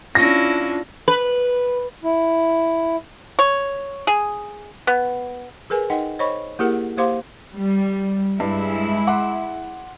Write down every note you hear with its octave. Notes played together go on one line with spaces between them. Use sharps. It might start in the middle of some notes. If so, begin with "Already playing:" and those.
C#4 D4 E4 F4 A#6
B4
E4
C#5
G#4
B3
G#4 A#4 B4 G#5
D#4 D#5 F#5 G5
C5 C#5 D#5 B5 C#6
A#3 E4 G4 G#4 A#4 F#5
A#3 G4 C5 F5 C6 D6
G3
G2 G#3 E4
F#5 C6 D6